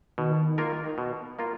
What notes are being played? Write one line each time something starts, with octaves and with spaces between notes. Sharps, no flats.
B2 D#3
A#3 F4 A#4
B2
A#3 F4 A#4